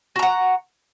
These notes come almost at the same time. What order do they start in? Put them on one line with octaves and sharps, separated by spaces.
F#4 A#5 F#5